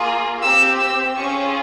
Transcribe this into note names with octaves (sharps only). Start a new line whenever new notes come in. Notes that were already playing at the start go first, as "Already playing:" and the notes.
Already playing: A#3 F4 G#4
C4 G4 E6
E6
C#4 F4 G#4 C#6